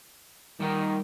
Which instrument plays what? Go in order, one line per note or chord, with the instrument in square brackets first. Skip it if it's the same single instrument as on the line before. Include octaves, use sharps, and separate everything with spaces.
[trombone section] D#3 [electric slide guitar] G3 D#5 F#5